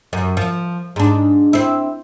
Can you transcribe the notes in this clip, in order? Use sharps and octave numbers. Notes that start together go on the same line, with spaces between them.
F#2
F3
G#2 D4
C4 E4